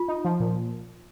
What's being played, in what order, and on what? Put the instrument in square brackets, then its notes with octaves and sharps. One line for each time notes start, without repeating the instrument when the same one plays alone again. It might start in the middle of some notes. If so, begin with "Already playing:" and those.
Already playing: [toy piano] F4
[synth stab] D#4
F3
A#2